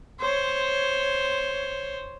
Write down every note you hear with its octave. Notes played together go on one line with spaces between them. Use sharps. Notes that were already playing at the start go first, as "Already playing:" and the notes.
C5 C#5